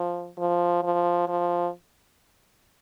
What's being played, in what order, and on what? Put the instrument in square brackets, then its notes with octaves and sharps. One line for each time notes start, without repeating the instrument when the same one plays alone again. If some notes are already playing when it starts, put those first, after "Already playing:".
Already playing: [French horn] F3
F3
F3
F3